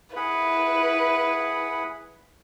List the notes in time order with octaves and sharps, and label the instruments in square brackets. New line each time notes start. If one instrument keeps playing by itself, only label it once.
[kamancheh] E4 B4 [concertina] G#4 F#5 B5